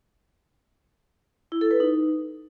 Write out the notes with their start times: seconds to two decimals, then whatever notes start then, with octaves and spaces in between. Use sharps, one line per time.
1.52 E4
1.61 A4
1.71 B4
1.80 D#4